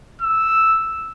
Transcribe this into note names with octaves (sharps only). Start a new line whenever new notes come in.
E6